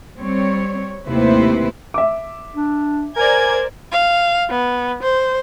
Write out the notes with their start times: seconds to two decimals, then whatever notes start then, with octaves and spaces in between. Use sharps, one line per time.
0.19 G3 C4 C#5
1.09 D#2 C3 A3 E4 B4 C5
1.94 E5 D6
2.55 D4
3.16 A#4 C5 D5 G#5 G#6
3.92 F5
4.50 B3
5.03 C5